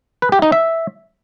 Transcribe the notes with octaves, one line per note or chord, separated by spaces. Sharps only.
B4
G4
D#4
E5